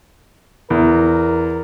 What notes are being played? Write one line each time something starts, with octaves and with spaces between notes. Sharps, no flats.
E2 A#4